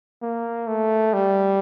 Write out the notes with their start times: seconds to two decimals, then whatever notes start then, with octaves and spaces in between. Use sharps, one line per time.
0.22 A#3
0.67 A3
1.13 G3